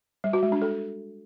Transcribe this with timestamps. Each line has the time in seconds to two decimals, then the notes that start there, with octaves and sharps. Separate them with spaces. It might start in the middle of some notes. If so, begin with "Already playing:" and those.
0.24 G3
0.33 F#4
0.43 G#3
0.52 D4
0.62 A4